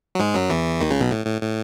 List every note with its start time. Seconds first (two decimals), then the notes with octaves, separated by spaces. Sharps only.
0.15 F#3
0.19 G#2 G#3
0.34 F#2 F#3
0.50 E2 E3
0.80 D#2 D#3
0.91 C#2 C#3
1.00 B1 B2
1.11 A2
1.26 A2
1.42 A2